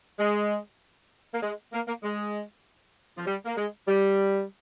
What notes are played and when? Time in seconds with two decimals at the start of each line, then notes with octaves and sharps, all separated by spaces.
0.19 G#3
1.34 A#3
1.43 G#3
1.73 A#3
1.88 A#3
2.03 G#3
3.18 F3
3.27 G3
3.45 A#3
3.57 G#3
3.88 G3